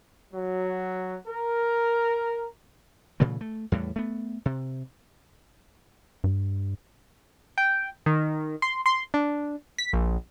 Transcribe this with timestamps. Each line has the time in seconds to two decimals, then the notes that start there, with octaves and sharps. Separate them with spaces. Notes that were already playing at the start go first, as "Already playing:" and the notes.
0.33 F#3
1.27 A#4
3.20 A#2 C#3 E3 A3
3.41 A3
3.72 E2 A2 G3
3.96 A3 B3
4.46 C3
6.24 G2
7.58 G5
8.06 D#3
8.62 C6
8.86 C6
9.14 D4
9.78 B6
9.93 A#1